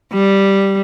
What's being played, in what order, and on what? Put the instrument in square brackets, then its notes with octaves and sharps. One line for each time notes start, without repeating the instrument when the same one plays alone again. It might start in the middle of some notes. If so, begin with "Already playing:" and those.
[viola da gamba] G3